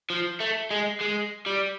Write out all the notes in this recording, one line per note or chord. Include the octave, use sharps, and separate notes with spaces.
F3
A3
G#3
G#3
G3